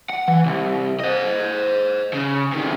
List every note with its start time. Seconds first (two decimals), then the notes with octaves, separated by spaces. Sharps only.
0.10 F#5
0.28 E3
0.46 C2
1.00 C5 D#5
2.13 C#3
2.52 C3 D#3